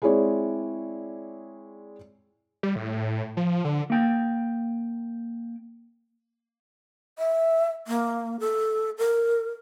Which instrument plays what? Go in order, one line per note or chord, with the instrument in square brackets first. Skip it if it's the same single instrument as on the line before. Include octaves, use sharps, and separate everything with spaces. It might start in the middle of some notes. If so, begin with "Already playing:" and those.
[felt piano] G#3 C4 E4 G#4 C#5 D5
[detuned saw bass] G3
A2
F3
D3
[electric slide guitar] A#3 G5
[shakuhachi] E5
A#3
A4
A#4